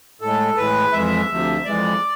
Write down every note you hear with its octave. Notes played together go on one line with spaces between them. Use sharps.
A2 G#3 A4
A2 E3 G#3 B4
F2 E3 G#3 E5
D2 C3 F3
F2 E3 G#3 D5